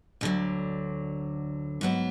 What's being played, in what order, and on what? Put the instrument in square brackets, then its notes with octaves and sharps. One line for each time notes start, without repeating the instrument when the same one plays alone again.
[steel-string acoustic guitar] D2 D3 F#3
G#2 F#3 B3